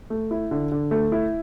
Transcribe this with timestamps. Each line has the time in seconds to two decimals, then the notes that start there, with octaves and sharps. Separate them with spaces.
0.10 A3
0.31 E4
0.51 D3
0.72 D3
0.91 A3
1.12 E4